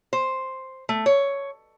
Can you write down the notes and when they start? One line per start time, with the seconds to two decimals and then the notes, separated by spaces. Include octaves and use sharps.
0.13 C5
0.89 A3
1.06 C#5